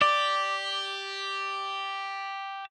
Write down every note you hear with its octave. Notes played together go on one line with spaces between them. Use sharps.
G4 D5